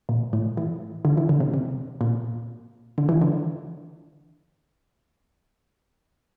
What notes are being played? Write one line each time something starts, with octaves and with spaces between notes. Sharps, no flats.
A#2
A2
E3
D3
E3
D3
C3
C3
A#2
D3
E3
D3